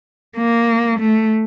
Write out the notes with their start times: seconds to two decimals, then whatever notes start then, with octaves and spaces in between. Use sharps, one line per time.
0.37 A#3
0.99 A3